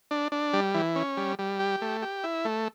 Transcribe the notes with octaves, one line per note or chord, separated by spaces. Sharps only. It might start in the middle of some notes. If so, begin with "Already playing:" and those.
D4
D4
G3
E3
C#4
G3
G3
G4
A3
G4
E4
A3